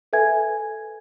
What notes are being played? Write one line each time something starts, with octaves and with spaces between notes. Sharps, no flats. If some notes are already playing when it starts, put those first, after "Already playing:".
A4 B4 E5 G#5 G#6